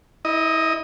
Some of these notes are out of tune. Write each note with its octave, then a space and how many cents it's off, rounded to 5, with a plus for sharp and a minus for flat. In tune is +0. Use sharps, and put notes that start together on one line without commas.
E4 -30 D#5 +0